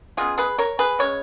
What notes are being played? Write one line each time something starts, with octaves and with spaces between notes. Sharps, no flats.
C#3 G#3 B3 F4 G#4
G#4 B4
A#4 C#5
G#4 B4
C#3 G#3 C#5